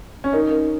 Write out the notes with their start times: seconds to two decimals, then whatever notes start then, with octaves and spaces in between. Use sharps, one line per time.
0.24 C#4
0.33 D#4 A#4
0.51 A#4